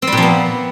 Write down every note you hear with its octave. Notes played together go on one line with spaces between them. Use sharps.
C4
G3
A#2
F3
B3